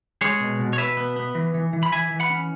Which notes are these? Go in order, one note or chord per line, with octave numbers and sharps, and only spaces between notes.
G#3 G#4 C#5
B2
B2
C#5
B2 B4 E5
B3
B3
E3
E3
E3
B5
E3 E5 G#5
E3
F#5 B5
C#4